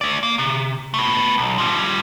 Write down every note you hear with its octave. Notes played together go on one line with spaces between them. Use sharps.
A3 D5
A#3
C3
A3 B3
B1
F3 G3